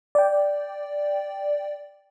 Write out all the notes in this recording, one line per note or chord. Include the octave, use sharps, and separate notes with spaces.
D5 G5